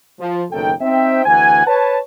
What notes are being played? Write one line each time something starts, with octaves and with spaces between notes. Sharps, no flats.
F3
F#1 B1 D#3 A4 G5
C4 D#4 C5 E5 G5
D2 E3 F#5 G#5
B4 C#5 A5